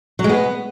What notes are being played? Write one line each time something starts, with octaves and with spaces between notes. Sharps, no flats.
F#3
G#3
B3